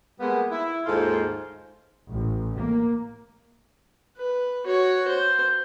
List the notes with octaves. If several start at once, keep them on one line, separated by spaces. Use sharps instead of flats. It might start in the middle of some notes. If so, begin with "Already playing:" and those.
G3 G#3 A#3 B3
E4
D#2 G#2 G#3 F4 A4 C5
A1
A#3
B4
F#4 C#5
C5